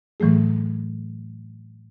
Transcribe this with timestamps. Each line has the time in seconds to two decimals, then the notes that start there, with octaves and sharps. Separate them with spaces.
0.20 A2 E3 F#3 A3 G#4